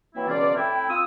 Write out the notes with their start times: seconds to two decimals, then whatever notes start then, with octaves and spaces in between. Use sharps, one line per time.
0.15 E3 F#3 A#3 C4 E4
0.27 C#2 B2 E3 C#4 F4 D5
0.55 A2 C4 E4 G5
0.89 F4 D#6 E6